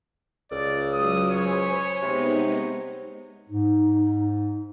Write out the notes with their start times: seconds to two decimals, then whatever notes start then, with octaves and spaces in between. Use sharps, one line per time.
0.51 C#2 D5
0.93 F#3 G#3 D#6 E6
1.31 C5 C#5 G#5 B5
2.02 C3 G#3 B3 D#4
3.49 G#2 D#4